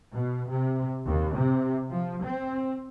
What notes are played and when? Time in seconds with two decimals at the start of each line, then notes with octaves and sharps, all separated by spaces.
0.12 B2
0.50 C3
1.06 D#2
1.35 C3
1.90 F3
2.24 C4